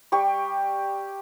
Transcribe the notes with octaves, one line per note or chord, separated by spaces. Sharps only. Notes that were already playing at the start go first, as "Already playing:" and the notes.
G3 G4 C#6